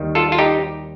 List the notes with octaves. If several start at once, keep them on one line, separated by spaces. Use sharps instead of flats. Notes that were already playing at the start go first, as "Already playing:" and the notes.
Already playing: D#2 D#3 G3
F4 A4
F4
D#4 G4